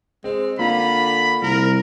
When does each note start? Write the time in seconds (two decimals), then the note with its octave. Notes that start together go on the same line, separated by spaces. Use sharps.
0.24 G#3 C4
0.59 D3 A#3 F4 B5
1.42 C2 A#4